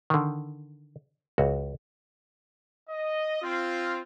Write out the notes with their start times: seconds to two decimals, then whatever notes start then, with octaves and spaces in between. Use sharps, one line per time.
0.10 D3 D#3
1.38 C#2 F#4
2.89 D#5
3.41 C4 F4